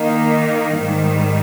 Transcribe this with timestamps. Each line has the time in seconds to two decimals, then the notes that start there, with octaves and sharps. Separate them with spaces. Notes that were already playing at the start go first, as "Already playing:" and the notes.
Already playing: D#3 A#3 D#4
0.75 G#2 D#3 G3